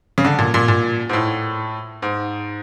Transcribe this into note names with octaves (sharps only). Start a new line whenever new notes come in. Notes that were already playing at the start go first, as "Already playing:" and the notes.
C#3
D3
A#2
A#2
A#2
G#2
A2
G#2